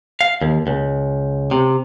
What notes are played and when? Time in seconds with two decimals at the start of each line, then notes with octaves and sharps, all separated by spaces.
0.21 F5
0.41 D#2
0.67 C#2
1.51 C3